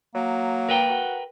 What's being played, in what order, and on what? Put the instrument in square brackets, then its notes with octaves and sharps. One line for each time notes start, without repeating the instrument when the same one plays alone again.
[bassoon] F#3 [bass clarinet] A#3
[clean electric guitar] A#4 B4 G5
[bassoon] F#4